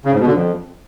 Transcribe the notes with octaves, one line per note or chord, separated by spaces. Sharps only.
C#3
G#2
B2
D3
F2